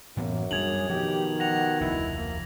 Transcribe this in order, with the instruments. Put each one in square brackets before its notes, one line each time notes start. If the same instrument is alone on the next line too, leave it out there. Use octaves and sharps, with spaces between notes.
[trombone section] F#2 [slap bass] A2 E3 B3 [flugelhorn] A#3
[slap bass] G3 B3 D4 [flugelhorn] G#4 [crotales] G#6 F7 F#7
[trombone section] B2 D#3 [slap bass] F3 [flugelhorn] G4
[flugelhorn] F#5 [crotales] A#6 F7
[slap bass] F1 D2 F3 [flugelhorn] E4
[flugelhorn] A#3